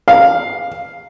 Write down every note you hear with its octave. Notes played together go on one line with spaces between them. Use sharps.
F5